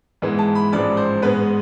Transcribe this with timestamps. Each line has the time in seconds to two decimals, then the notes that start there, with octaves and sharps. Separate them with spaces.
0.22 G#2 E3 G#3 B3
0.38 A5
0.55 B5
0.72 A1 G#2 F3 G#3 D5
0.97 C5
1.22 G#2 G#3 B3 B4